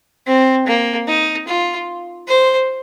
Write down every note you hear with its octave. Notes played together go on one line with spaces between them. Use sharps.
C4
A#3
D#4
F4
C5